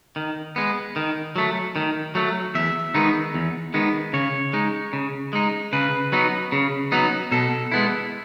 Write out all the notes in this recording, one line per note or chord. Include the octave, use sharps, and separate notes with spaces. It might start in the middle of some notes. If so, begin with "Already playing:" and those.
D#3
G#3 B3
D#3
F#3 A3
D#3
F#3 A3
E2 E5
D#3 G#3 B3 D#4
E2
D#3 G#3 B3 D#4
C#3 C#5
G#3 D#4
C#3
G#3 D#4
C#3 B4
F#3 B3 D#4
C#3
F#3 B3 D#4
B2 A4
G#3 B3 E4